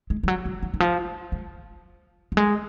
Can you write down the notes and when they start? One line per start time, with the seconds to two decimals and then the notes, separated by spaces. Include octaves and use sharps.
0.10 G#3
0.23 F3
0.28 F#3
0.45 F#3
0.63 F3
0.74 D#3
0.80 F3
1.32 G#3
2.32 F#3
2.37 G#3